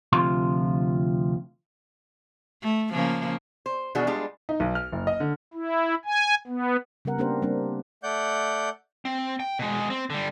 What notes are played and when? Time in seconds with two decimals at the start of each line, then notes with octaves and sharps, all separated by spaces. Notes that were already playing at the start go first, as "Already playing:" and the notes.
0.13 D2 C3 F3 F4 C6
2.63 A3
2.92 C#3 F3 A#3
3.66 C5
3.95 B2 D#3 E3 D4 F#4 G#4
4.07 G3 G#3 B3 D4 F4 G#4
4.49 D#4
4.60 B1
4.75 F6
4.92 F#1
5.07 D#5
5.20 D3
5.54 E4
6.05 G#5
6.47 B3
7.05 C#3 G3 B3 A#4 F#5
7.18 A#3 C4 D4 G4 A#4 C5
7.42 G3 A#3 C4 D4
8.03 A3 D5 F#5 G6
9.05 C4
9.40 G5
9.59 B2 G#3
9.90 C4
10.10 D3 G3